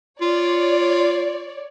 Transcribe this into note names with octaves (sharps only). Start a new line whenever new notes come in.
F4 C#5 D5